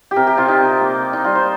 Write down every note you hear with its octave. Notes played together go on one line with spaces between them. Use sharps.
G4
C3 A#4
G4
C3 F4
D#4
C3
A#3
A#3
D#4
G3 F4
C5